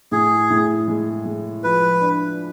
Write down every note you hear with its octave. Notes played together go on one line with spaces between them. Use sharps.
A2 G#4
A2
G#3
G#3
F3 B4
D4